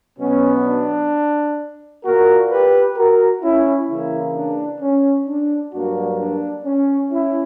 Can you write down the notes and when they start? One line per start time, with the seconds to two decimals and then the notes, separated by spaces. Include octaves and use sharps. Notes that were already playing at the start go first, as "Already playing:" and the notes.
0.19 B2 F#3 B3 C#4
0.66 D4
2.04 A#2 A#3 F#4 A#4
2.50 G4 B4
2.96 F#4 A#4
3.42 C#4 E4
3.89 C#3 E3 A#3 C#4 E4
4.34 D4
4.81 C#4
5.27 D4
5.73 G2 F#3 A#3 D4 F#4
6.19 D4
6.65 C#4
7.11 C#4 E4